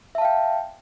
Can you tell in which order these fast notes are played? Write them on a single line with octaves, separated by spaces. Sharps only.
E5 A5 F5 G5